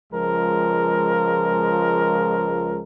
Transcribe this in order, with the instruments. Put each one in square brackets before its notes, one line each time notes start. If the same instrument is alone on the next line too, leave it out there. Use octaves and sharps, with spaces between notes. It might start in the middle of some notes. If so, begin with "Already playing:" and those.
[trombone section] C#2 F3 G#3 A#4